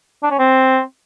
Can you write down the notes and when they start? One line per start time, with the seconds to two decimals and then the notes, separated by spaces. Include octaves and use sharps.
0.23 D4
0.31 C#4
0.39 C4